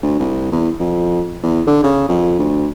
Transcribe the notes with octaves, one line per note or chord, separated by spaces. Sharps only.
D2
C2
E2
F2
E2
D3
C#3
F2
D2